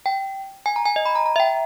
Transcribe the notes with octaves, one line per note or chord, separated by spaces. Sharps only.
G5
G#5
A#5
G#5
D#5
B5
A#5
A#5
E5
G5